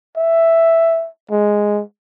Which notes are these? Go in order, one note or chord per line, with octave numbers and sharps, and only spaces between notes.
E5
G#3